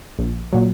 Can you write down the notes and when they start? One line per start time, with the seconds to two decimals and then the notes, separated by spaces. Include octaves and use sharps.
0.19 A#1
0.53 A#2 F#3